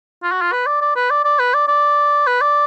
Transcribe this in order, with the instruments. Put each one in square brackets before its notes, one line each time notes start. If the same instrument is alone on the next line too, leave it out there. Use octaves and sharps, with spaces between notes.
[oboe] F4
F#4
F4
B4
D5
D5
B4
D5
D5
B4
D5
D5
B4
D5